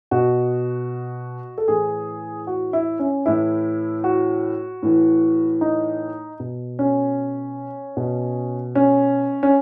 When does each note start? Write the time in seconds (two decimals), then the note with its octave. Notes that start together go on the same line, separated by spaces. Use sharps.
0.11 B2 F#4
1.58 A4
1.68 A2 E3 G#4
2.47 F#4
2.73 E4
2.99 C#4
3.26 A2 E3 E4
4.04 F#4
4.83 A2 E3
5.61 D#4
6.40 B2
6.79 C#4
7.97 B2
8.75 C#4
9.43 C#4